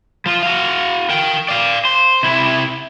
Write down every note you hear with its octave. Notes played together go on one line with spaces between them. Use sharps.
F3 F4
F#4 F5
A#4 G5
D5 F5
C5
C3 E4